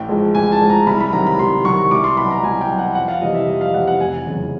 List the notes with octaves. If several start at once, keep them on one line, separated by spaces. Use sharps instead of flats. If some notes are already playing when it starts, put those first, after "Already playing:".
Already playing: A1 G5
G#2 F3 G#3
A1 G#5
A5
G#2 F3 G#3
A#5
C2 B5
B5
C3 D#3 F#3 A#5
B5
C2 C6
C3 D#3 F#3 C#6
C2 D6
C6
B2 F#3 B5
A#5
C2 G#5
G5
B2 F#3
F#5
F2 F#5
F5
C3 E3 G3 D#5
E5
F2 D#5
F5
C3 E3 G3 F#5
F#5
F1 G#5
E2 C#3 F#3